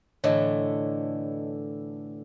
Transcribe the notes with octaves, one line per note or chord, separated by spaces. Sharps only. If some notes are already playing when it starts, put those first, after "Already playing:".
A2 D3 E3 C#5 D#5